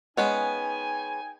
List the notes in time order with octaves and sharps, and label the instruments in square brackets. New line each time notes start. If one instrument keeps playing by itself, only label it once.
[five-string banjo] G#3 B3 C#4 [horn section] D#4 G5 G#5